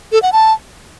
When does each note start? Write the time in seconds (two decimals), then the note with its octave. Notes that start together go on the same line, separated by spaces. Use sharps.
0.12 A4
0.22 F#5
0.33 A5